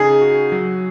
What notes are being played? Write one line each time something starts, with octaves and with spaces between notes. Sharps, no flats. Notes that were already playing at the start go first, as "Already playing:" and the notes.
Already playing: C#3 D#4 G#4
F#4
F#3